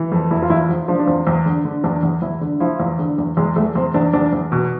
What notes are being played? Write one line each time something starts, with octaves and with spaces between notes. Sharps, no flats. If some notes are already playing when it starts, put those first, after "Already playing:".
Already playing: E3
F2
E2 E4
F4
E2 E4
F3
F3 D4
D4
E2 C4
E2
D3
D3
E2 D4
E2
E2 E4
D3
F3 E4
E2
D3
E2
E2 G#3
E2 A3
E2 C4
E2 D4
E2 D4
E2
B2